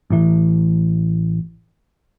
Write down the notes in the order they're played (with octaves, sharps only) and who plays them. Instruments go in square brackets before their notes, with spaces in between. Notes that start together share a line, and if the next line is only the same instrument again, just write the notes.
[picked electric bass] A1 A2 E3